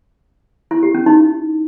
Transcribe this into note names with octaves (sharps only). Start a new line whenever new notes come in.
E4
G4
C#4
D#4